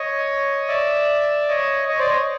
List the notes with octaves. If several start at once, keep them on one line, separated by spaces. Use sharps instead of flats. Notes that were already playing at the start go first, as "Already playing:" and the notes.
Already playing: C#5 D#5
D5 E5
C#5 D#5
C#5 D#5
C5 D5
C#5 D#5